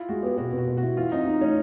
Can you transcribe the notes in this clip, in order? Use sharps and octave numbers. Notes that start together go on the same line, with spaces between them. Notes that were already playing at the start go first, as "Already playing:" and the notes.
Already playing: E4 F4
G#3 F#4
B3 G4
B2 F#4
B2
F#4
B2
F#4
E4
E3 F4
C4 D#4
D#4
A3 C#4